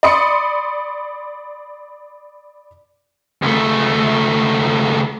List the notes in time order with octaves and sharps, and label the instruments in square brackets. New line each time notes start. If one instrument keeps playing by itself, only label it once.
[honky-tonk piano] D5 B5 C6 D#6 C#7
[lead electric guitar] C#2 A3